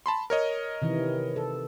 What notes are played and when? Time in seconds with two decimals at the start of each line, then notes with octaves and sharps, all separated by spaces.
0.06 A5 B5 C6
0.30 A#4 C#5 D#5
0.82 C3 D#3 E3
1.36 A4